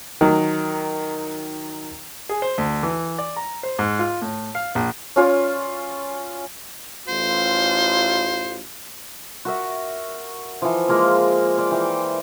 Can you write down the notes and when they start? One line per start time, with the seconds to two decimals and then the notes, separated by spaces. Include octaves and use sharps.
0.21 D#3 F#3
2.29 G#4
2.42 C5
2.58 D2
2.83 E3
3.18 D5
3.37 A#5
3.63 C5
3.79 G#2
3.99 F4
4.22 A2
4.55 F5
4.75 A#1
5.16 C#4 F4 C#5 D5
7.08 A1 F4 C5
9.45 F#4 A#4 E5
10.62 E3 F3
10.88 G#3 A#3 F4 G#4
11.58 C5 D5
11.71 E3 G5